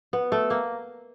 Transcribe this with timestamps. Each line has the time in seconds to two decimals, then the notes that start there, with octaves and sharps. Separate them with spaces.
0.13 B3
0.32 A3
0.50 A#3